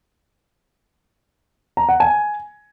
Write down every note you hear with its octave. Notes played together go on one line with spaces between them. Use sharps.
A#5
F#5
G#5